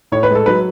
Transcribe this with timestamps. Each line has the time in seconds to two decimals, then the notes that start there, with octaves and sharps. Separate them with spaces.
0.12 A2 C#5
0.23 B4
0.31 G#3 A4
0.46 F#3 B4